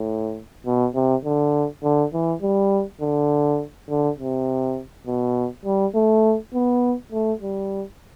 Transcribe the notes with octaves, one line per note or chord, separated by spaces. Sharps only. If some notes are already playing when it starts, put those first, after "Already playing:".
Already playing: A2
B2
C3
D3
D3
E3
G3
D3
D3
C3
B2
G3
A3
B3
A3
G3